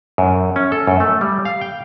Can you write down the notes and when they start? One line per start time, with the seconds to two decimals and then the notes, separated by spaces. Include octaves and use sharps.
0.18 F#2
0.56 C#4
0.72 A4
0.87 F#2
1.00 A3
1.21 G3
1.45 F5
1.61 G5